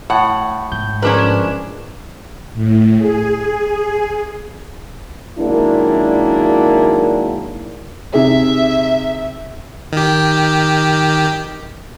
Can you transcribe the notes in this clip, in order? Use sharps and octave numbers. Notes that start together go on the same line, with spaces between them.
A2 F#5
G#2 G6
F3 G#3 C#4 D4 A#4 B4
A2
G#4
D#3 F#3 G#3 A#3 D4 E4
C3 D#4 G#4 E5
D#3 G4